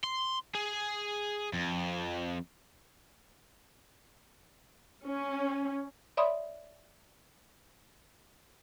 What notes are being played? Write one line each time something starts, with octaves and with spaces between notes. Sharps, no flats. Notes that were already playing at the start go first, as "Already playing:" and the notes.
C6
G#4
F2
C#4
C#5 D5 E5 B5 C6 D#6